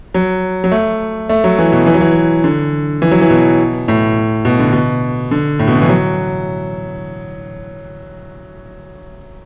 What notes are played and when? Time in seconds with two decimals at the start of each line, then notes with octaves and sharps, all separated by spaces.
0.14 F#3
0.64 F#3
0.72 A3
1.29 A3
1.44 F#3
1.59 E3
1.72 B2
1.86 E3
1.94 F#3
2.01 E3
2.44 D3
3.02 E3
3.11 F#3
3.22 E3
3.30 B2
3.88 A2
4.45 B2
4.59 D3
4.73 B2
5.31 D3
5.59 A2
5.68 B2
5.75 D3
5.82 E3
5.89 F#3